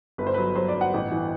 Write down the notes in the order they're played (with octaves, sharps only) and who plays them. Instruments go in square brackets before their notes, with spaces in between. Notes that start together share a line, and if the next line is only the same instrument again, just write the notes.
[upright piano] G1 B4
C5
F#3 B4
F#3 C5
D5
G1
F#5
A1
E3